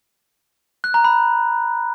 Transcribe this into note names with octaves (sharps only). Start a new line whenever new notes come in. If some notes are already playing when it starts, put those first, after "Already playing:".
F#6
A#5
B5